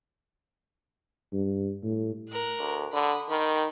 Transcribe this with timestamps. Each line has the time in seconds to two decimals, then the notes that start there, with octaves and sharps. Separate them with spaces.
1.33 G2
1.83 A2
2.30 A#4 F#6
2.59 D2
2.93 D3 B5 D#6
3.29 D#3 G5 B5